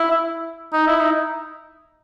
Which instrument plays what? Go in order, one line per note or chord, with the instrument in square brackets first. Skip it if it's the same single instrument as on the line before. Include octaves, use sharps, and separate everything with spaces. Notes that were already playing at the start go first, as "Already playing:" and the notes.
Already playing: [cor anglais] E4
D#4
E4
D#4